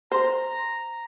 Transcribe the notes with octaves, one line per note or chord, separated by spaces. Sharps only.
C5 A#5